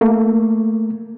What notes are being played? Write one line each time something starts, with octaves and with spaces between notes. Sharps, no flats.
A3 A#3